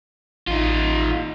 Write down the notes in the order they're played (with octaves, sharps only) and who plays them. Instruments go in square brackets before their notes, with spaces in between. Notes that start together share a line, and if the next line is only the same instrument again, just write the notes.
[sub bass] A1 [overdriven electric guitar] D#4 F4